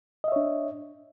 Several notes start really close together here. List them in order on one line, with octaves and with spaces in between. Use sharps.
D#5 E5 C#5 D4